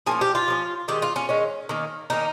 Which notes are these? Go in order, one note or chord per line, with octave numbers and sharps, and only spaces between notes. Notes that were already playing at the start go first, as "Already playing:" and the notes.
F3 A#3 C#4 G#4
G4
F4
F3 A#3 C#4
D#3 G#3 C#4 G4
F4
C#4
D#3 G#3 C#4
D#3 A#3 C#4
D#3 A#3 C#4 D#4